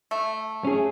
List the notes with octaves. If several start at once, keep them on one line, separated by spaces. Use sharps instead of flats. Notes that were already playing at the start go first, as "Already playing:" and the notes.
A3
C#4 G#4